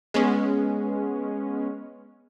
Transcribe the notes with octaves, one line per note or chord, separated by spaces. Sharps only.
G#3 B3 C#4